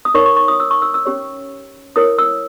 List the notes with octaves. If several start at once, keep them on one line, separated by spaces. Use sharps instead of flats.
D#6
D#4 A#4 C#5 C#6
C#6
C#6
D#6
E6
C#6
E6
E6
C#4 G4 C#5
E4 A#4 C#5 D#6
E6